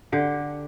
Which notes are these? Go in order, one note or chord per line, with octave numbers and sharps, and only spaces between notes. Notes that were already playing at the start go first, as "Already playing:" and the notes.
D3 G4